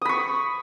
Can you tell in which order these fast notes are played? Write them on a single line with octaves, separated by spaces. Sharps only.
D#6 B5 C#6